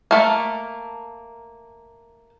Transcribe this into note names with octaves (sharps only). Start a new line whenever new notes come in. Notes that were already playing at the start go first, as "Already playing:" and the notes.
A3 A#3